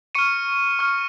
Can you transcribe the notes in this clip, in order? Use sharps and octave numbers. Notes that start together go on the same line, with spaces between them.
C#6 F6 C#7 D#7
C#6 F6